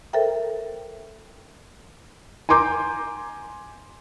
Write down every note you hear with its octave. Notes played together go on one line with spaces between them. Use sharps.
A4 A#4 C5 E5 G5 A#5
G#5 A#5 C6 D6 G6